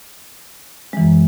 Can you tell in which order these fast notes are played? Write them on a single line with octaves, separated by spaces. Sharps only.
G#3 E3 F#2